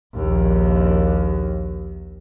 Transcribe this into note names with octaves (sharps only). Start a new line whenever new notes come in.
A#1 D#2